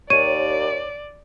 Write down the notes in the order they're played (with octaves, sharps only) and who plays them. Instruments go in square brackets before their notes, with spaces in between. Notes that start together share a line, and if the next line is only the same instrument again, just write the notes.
[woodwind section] D#2 [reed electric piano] C#5 [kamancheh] D5 [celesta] D#7